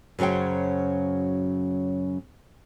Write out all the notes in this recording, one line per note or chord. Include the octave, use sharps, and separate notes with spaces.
F#2 C#3 F#3 C5 G5